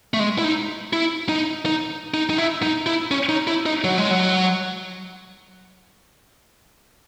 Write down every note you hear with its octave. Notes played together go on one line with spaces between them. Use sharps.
A3
G#3
E4
D#4
E4
D#4
D#4
D#4
D#4
E4
D#4
E4
C#4
D#4
E4
D#4
F#3
G#3
F#3